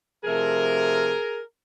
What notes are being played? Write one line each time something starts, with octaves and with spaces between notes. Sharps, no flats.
C3 F3 A3 G#4 A#4